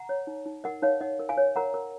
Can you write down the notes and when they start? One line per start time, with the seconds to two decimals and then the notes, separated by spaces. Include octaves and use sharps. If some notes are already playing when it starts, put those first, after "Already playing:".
Already playing: F#5 A#5
0.09 C#5
0.27 D#4
0.46 D#4
0.64 A#4 D#5 F#5
0.82 D#4 C#5 F5
1.00 D#4 D#5 F#5
1.19 A#4
1.29 F5 G#5
1.38 C#5
1.56 A#4 F#5 A#5
1.74 A#4